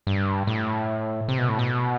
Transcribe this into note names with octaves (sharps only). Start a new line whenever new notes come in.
G2
A2
C3
B2
A2
B2